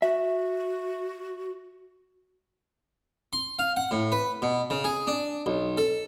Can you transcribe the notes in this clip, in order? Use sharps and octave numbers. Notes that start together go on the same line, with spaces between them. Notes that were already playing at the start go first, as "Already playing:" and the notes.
F#4 E5
C6
F5
F#5
A2
B4
B2
C#3
G#4
D4
B1
A4